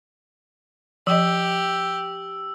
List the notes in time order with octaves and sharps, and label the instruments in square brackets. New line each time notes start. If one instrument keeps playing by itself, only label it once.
[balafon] F3 D#5 [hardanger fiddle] G4 [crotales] E6